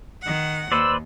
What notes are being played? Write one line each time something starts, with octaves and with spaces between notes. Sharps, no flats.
D#3 F#5
D#2 B4 C5 D5 E6